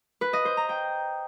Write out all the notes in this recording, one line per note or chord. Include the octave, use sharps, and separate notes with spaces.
B4
D#5
C5
A#5
G5